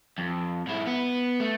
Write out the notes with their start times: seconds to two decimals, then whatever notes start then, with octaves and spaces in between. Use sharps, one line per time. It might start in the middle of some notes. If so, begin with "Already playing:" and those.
0.18 F2
0.67 G#2 E4
0.87 B3
1.40 A3